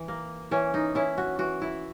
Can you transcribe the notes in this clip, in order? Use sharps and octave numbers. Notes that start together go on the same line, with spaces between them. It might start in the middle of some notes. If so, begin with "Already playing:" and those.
Already playing: E3
A#3
E3 C#4
D#4
C#4 E4
F#4
E3 F#4
E4